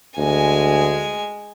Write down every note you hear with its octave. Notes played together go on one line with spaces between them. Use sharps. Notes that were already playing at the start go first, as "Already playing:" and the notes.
D2 G#3 G#5